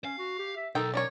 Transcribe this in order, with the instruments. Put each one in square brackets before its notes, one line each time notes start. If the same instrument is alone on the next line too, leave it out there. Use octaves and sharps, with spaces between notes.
[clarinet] C#4 [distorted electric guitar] F5
[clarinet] F#4
G4
E5
[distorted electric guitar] B1 [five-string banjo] D#3 D#4 G5 [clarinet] A4
[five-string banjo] C#4 A#4 C#5 [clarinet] D5